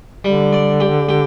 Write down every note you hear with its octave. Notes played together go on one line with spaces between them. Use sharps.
D3 G3
D5
G4
G4